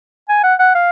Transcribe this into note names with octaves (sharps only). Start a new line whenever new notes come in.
G#5
F#5
F#5
F5